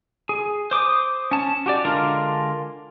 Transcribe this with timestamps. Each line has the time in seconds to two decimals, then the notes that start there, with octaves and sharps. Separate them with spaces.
0.29 G#4
0.71 C5 D6 D#6
1.31 C#4 A5
1.66 F#4 G4 D5
1.85 D3 G#3 D4 F4 A#4